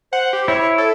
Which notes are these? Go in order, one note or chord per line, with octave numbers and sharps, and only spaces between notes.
C5 F#5
G4
E4 C#5
A4 C#5